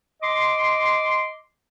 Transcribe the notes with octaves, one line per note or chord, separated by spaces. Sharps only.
D#5 C6 D6